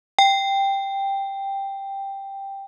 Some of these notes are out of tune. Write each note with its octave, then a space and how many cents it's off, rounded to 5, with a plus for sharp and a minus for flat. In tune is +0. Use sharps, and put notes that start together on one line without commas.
G5 +5